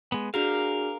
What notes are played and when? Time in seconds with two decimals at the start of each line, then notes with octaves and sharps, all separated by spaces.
0.12 G#3 B3
0.34 D4 F#4 G#4 A#4 F5